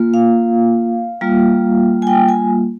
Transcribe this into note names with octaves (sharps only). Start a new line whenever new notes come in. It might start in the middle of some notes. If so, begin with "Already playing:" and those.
Already playing: A#3 F4
F5
G3 A#3 F4
G#5
G5
G#5